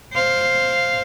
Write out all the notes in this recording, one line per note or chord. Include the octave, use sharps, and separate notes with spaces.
C5 F5